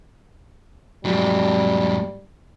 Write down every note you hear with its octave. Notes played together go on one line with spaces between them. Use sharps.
G#2 F#3 G3